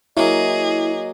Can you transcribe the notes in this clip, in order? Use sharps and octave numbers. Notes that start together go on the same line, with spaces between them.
F#3 A#3 E4 G#4 D#5